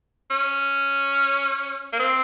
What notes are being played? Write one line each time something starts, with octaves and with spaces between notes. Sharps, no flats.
C#4
A#3
C4